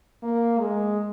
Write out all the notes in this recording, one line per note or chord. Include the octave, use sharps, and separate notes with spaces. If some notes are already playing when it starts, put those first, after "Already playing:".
A#3
G#3